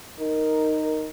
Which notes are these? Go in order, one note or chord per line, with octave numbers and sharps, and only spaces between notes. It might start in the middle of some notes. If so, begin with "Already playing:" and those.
D#4 A#4